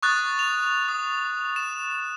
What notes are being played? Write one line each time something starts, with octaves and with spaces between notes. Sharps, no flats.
C#6 D#6 F#6 A6
F7
D#6
E7